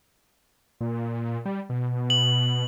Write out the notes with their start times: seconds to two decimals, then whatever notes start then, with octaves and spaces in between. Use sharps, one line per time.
0.81 A#2
1.46 G3
1.70 B2
2.10 F#7